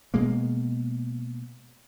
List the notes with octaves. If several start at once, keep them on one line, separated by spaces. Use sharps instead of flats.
B2 G#3 A#3